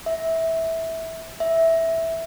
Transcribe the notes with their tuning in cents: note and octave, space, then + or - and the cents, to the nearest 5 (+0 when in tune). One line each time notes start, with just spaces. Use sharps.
E5 -15
E5 -5